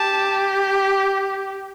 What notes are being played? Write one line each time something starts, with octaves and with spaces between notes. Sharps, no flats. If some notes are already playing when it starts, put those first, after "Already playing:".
Already playing: G4 A5